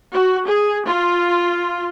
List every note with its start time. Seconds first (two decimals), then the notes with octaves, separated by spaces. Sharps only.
0.10 F#4
0.43 G#4
0.86 F4